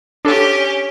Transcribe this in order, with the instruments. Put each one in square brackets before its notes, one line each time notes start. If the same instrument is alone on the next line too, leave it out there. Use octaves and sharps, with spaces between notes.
[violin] C#4 G4 [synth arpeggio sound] D4 A4